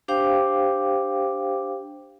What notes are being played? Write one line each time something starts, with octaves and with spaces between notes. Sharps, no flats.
D4 G4 C5 F5 G5 D6